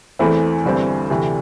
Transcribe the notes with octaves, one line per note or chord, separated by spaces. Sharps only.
E2 E3 A3 C4 E4
G1 G2 E3 C4
D2 C3 E3 A3